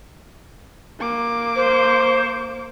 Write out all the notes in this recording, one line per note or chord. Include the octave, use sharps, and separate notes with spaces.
A#3 D6
C5